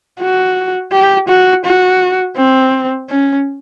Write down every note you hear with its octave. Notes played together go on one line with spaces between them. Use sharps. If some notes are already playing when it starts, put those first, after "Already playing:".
F#4
G4
F#4
F#4
C4
C#4